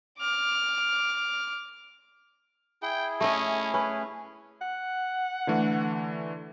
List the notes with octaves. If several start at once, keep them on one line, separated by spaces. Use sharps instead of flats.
D6 F6
E4 G#4 G5
A3 C#4 D#5
C#4 B4
F#5
D3 E3 A3